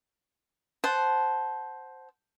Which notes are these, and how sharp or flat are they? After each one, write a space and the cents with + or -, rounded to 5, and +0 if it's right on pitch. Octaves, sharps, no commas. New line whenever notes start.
C5 +0 F#5 +0 A5 -15